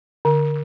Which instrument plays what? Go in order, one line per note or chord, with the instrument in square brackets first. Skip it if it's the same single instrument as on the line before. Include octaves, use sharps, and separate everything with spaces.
[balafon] D3